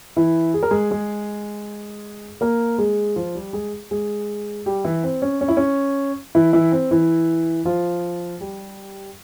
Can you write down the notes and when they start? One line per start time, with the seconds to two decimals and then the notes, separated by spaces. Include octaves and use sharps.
0.17 E3 E4
0.54 G#4
0.63 A#4
0.71 G#3 G#4
0.91 G#3 G#4
2.41 A#3 A#4
2.78 G#3 G#4
3.16 F3 F4
3.35 G3 G4
3.53 G#3 G#4
3.91 G#3 G#4
4.66 G3 G4
4.84 E3 E4
5.03 C4
5.22 C#4
5.41 C#4
5.48 E4
5.57 C#4
6.35 E3 E4
6.53 E3 E4
6.72 C4
6.91 E3 E4
7.65 F3 F4
8.40 G3 G4